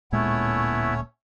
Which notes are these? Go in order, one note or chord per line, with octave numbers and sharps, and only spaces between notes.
D1 A#2 G#3 A3 B3 C#4 E4 C#5